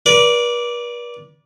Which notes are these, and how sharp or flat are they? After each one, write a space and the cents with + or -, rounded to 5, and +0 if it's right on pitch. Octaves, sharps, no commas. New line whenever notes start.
B4 -45 D5 -10